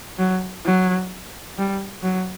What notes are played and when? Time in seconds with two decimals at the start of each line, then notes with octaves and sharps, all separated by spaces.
0.19 F#3
0.65 F#3
1.58 G3
2.03 F#3